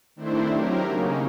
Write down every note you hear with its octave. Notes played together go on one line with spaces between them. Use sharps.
D#3 A3 C4 D4 E4 C5
F#3 G4 A#4
C#3 A#3 C#4 D#4